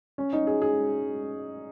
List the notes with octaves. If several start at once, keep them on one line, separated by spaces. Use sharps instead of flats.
C#4
D#4
G#4
G#4